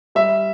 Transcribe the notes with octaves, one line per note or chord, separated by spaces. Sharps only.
G3 E5